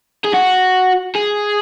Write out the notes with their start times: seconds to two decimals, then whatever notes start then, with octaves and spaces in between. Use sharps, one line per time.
0.24 G#4
0.33 F#4
1.16 G#4